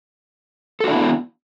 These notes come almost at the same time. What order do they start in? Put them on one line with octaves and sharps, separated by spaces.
A4 F#4 D4 E4 B3